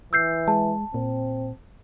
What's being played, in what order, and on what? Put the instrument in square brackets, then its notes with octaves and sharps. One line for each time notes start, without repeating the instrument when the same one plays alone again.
[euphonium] E3 [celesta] E6 G6 C7
[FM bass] G#3 [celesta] A5
[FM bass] A#2 [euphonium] C4